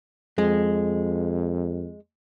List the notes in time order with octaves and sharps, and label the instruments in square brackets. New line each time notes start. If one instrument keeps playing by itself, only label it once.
[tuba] F2 [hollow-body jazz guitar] G#3